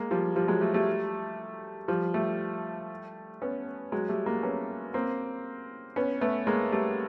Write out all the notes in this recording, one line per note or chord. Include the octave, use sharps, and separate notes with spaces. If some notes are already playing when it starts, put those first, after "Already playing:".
Already playing: G#3 A#3
F3 G3
F3 G3
F#3 G#3
G3 A3
G3 A3
F3 G3
G3 A3
B3 C#4
F#3 G#3
G3 A3
G#3 A#3
B3 C#4
A#3 C4
B3 C#4
A3 B3
G#3 A#3
G3 A3